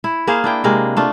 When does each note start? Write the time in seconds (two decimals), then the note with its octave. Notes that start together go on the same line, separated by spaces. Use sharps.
0.04 E4
0.27 A#3 G#4 C5 F5
0.44 D4 E4 G5
0.64 C3 G#3 A#3
0.97 A3 D4 F4